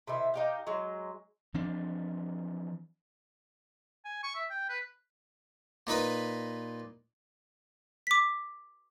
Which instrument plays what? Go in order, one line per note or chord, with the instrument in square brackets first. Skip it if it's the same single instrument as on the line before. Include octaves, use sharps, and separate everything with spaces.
[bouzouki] C3 D#3 E4
D#4 G4 F5
F#3 G#3
[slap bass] E3 F3 C4 D4
[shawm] G#5
C#6
E5
G5
B4
[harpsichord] A#2 D#4 B4 B5
[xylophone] D6 B6